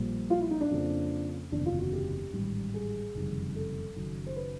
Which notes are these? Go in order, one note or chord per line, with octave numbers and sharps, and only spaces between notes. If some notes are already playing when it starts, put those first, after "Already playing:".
Already playing: A#1 A#2 G3
F4
E4
D#4
D4
F2 C#3 F3 A#3
F#1 E2 C3 D#3 D4
F4
F#4
G4
A1 G#2 D#3 G3
G#4
F#1 F2 C3 D#3 G3
A4
F#1 F#2 D#3 F#3
C5
B4